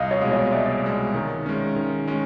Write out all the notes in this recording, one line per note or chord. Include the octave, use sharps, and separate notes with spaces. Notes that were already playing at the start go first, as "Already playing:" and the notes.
Already playing: C2 D#5 F5
C#5 D#5
B2 G#3
C#5 D#5
C2 D5 E5
B2 G#3
D#3
G#3 C#4
D#3
G#3 C#4